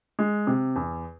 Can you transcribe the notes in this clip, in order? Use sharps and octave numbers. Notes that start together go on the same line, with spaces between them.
G#3
C3
E2